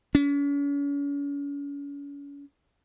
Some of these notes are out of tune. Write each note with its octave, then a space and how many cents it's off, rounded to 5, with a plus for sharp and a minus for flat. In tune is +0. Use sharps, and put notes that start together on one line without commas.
C#4 +40